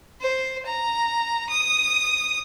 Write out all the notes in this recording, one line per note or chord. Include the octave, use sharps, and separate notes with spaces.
C5
A#5
D#6